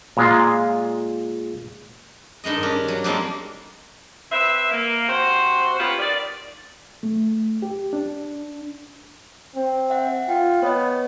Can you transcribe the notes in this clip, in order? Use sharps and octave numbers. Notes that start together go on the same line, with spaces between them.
A#2 G#3 F4
G2 D#3 G#3 D#5
C#4 D4
F#3
F3 G3 G#3 A#3 C4 D4
C4 B4 E5
A#3
C3 F#4 C5
A#3 C#4 F4 G4 B4
D#3 D5
A3
G4
D4
C4
E5 F#5
F4 G5
B3 C#5 D#5